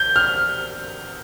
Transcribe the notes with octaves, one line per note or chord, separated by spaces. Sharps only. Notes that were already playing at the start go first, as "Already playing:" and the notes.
Already playing: G6
F6